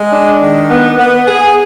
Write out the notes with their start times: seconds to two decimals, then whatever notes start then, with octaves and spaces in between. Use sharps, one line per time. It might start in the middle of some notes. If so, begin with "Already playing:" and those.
Already playing: G#3
0.11 D4
0.40 D#3
0.69 B3
0.98 B3
1.27 G#4